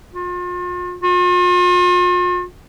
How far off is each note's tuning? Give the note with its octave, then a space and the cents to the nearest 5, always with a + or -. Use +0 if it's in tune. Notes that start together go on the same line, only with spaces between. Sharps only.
F4 +40
F4 +45